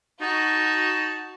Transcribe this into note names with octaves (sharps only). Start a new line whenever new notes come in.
D#4 F#4 A5